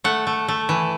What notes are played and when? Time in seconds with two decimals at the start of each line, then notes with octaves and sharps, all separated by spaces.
0.04 A3 F#5
0.27 A3
0.48 A3
0.69 E3